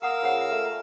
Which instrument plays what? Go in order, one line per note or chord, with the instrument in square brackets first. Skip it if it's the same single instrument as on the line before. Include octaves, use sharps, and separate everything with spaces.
[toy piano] G#4 F#5 D#6 [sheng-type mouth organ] A#4 F5 E6
[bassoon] C#3 [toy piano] F4 C5 F#5
[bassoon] A3